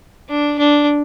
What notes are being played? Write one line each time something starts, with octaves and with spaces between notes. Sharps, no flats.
D4
D4